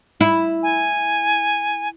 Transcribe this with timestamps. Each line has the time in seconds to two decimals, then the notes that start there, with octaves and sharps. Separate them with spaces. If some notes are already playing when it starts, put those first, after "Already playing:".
0.21 E4
0.63 G#5